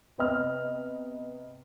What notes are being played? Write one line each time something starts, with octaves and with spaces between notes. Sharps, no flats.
C3 B3 D#5 F6